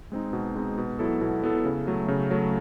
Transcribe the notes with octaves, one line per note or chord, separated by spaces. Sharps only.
G#3 C4 D#4
B2
G#3 C4 D#4
B2
F#3 B3 E4 A4
B2
F#3 B3 E4 A4
C#3
F#3 A3
C#3
F#3 A3